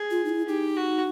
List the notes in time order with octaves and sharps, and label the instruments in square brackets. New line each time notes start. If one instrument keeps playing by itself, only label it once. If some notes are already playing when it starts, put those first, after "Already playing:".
Already playing: [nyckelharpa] G#4
[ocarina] F4
D#4
E4
[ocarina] D#4 [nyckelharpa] G4
[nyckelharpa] F#4